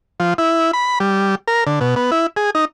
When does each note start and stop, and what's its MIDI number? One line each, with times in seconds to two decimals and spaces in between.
0.20 0.34 53
0.38 0.71 64
0.73 0.99 83
1.00 1.35 55
1.48 1.64 70
1.67 1.79 50
1.81 1.95 47
1.96 2.11 59
2.12 2.27 64
2.37 2.50 68
2.55 2.65 63